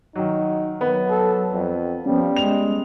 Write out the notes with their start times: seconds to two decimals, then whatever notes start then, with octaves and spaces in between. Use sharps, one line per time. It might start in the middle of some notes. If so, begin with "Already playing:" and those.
0.16 D#3 F#3 D#4
0.81 D#3 F#3 B3
1.10 A4
1.53 F2
2.06 F3 G3 B3 C#4
2.36 G#3 F7